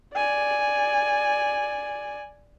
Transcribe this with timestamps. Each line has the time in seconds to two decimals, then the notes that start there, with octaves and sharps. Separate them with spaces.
0.14 D5 G#5